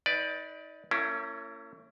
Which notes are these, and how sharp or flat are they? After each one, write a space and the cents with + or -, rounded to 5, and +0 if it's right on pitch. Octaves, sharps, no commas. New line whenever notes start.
D#4 +30 B4 +0 D5 +0
A#3 -45 C#4 +0 E4 +25